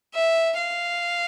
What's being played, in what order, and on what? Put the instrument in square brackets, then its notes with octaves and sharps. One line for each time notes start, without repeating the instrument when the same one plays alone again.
[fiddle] E5
F5